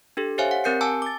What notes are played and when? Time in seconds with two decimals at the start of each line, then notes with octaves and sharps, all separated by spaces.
0.17 D4 G4 A4
0.38 G4 C5 C#5 E5 F5 G#5
0.51 F#5
0.64 C4 G4 A#4 G6 C7 C#7
0.81 G#5 A5 D6 E6
1.02 D6 A6